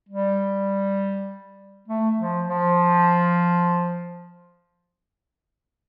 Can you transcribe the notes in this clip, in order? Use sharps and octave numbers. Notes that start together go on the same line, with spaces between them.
G3
A3
F3
F3